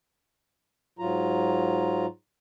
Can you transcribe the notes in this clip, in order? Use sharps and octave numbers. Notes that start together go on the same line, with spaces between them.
G#2 F#3 F4 A#5